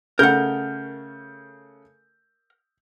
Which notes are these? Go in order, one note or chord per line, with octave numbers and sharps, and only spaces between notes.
C#3 A3 A#4 F#5 G6